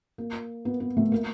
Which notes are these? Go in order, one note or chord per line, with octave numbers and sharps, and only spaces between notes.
A#3
B3
B3
A3
A#3